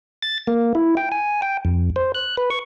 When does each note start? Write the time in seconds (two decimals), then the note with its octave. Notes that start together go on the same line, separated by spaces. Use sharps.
0.22 A6
0.47 A#3
0.75 E4
0.97 G5
1.12 G#5
1.42 G5
1.65 F2
1.96 C5
2.15 F#6
2.37 B4
2.50 C#6